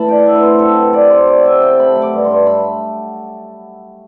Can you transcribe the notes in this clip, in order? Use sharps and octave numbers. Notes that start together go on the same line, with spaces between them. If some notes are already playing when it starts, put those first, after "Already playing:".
Already playing: A2 E3 A3 A5 B5
D4 G5
F#5
A2 E5
B4
C4 C5
F#3 A4
C3 B4
C3 D5
C4 C5
F#3 D5
C3 E5
C3 G5
A3 B5
F#3
D6
G2
C6
G2
A3 B5